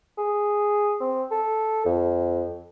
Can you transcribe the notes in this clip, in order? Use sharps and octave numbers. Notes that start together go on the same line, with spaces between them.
G#4
C4
A4
F2